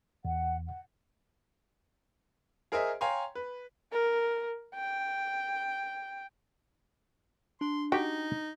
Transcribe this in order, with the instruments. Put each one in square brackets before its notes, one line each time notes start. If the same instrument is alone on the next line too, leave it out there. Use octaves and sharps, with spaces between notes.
[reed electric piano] E2 [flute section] F#5
[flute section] F#5
[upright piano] G#4 A#4 C5 D#5 E5 G#5
C#5 F5 G5 G#5 A#5 C6
B4
[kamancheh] A#4
G5
[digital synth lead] D4 [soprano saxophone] C6
[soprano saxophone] D#4 [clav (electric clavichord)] F#4 G4 [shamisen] G5